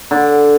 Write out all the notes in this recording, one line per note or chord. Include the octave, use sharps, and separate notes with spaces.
D3